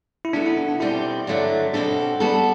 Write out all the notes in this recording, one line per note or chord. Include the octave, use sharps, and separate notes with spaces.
E4
C3 E3 B3 D4 F#4 A4
E4
D4
D4
E2 B2 G3 C4 E4 G4
G2 D3 F#3 A3 D4
B2 G3 C4 D4 F#4 A4
G3 B3 F#4 A4